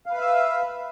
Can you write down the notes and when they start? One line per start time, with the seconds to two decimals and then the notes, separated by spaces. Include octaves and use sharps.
0.06 F5
0.10 B4
0.14 B5
0.17 E5
0.21 E6